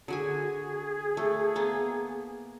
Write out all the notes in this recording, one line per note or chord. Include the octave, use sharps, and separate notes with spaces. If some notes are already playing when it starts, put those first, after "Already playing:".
D3 F#4 G#4 G#5
A3
A#3 B3